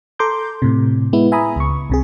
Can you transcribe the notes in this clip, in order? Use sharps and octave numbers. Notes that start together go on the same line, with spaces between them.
A4 A#5 C6 D6 G6
A2 C3
G#3 B3 E4
E5 G#5 A#5 B5 D#6
C#2 C#6
C2 C3 G#4